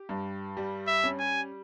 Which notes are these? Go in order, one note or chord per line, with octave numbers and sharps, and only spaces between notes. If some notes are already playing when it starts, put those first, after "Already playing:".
Already playing: G4
G2
G3
E5
C#4
G#5